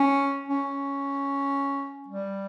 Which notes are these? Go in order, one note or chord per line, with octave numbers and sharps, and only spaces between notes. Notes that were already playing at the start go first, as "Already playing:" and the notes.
Already playing: C#4
C#4
G3